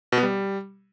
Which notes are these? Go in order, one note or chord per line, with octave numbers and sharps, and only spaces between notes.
B2
B3
G3